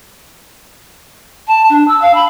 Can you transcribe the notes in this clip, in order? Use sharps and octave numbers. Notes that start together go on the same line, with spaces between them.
A5
D4
E6
F5
B5